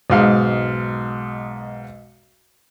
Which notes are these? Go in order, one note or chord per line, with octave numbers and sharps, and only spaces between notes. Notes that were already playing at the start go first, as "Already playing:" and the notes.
B1 G#2 F5